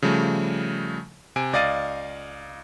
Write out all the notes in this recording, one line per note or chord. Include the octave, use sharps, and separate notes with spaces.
C#3 F3 G3 A3
C3 G#5 D7
C#2 D5 D#5 F5 A6 D#7